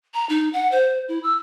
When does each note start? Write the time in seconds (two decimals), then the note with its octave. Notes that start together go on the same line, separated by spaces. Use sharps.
0.14 A#5
0.29 D#4
0.53 F#5
0.72 C5
1.08 E4
1.23 E6